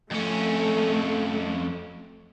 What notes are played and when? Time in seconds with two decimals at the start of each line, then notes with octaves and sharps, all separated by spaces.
0.11 F2 A3 C#4